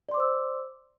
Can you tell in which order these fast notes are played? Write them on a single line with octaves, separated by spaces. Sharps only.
D5 C6 D6 C5 E6